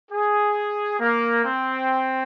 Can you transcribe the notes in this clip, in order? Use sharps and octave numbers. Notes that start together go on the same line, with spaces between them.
G#4
A#3
C4